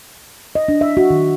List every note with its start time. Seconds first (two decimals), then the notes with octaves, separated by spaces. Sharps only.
0.55 D#5
0.68 D4
0.81 E5
0.97 F#4
1.10 D#3